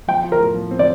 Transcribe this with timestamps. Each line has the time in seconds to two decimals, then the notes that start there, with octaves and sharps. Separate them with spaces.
0.08 F3 G5
0.24 F4
0.32 A#4
0.40 A2
0.55 F3
0.71 C4
0.79 D5